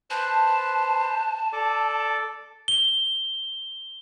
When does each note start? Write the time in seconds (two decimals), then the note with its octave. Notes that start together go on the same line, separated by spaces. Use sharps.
0.11 B4 C5 A5
1.53 A4 D5 D6
2.68 G7